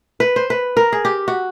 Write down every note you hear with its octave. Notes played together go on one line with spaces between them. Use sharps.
B4
C5
B4
A#4
G#4
G4
F#4